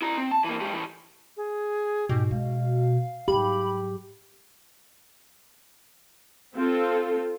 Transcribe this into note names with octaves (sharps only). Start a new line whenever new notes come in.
E4 A#5
C4
A5
E3 A#3
G#2 G4
A2 E3
G#4
G#2 B2 G4
G#3 F5
G#2 F#3 G4 B5
C4 F4 A4